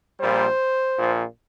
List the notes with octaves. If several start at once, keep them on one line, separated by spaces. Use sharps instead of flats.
A#1 A#2 G3 C5
A#1 A#2 F3